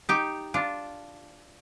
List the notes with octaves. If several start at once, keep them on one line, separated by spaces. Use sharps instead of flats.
D#4 G4
D4 F4